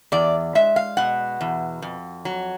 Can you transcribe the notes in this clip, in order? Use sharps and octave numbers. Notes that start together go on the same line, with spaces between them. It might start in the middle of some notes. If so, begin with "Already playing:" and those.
E2 D5
G#3 E5
F5
B2 F#5
E2
F2
F#3